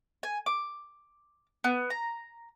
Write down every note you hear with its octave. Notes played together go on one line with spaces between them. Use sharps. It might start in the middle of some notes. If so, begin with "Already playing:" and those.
G#5
D6
B3
A#5